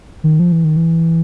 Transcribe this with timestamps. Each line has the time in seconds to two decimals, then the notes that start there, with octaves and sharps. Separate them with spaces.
0.24 D#3
0.40 F3
0.52 E3
0.64 D#3
0.77 E3